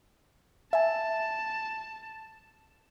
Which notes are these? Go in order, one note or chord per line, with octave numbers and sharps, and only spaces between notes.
E5 G#5 A5